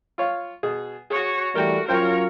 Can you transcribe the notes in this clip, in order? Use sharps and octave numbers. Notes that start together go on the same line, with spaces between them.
F4 C#5 F5
B2 G#4
F#4 G#4 C#5
E3 G3 A3 F#4 A#4 G5
F#3 C#4 F4 A#4 C5 C#5 F5 G5